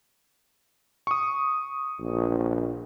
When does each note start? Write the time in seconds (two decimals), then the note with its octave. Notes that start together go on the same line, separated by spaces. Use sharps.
1.07 C#6 D#6
2.01 A#1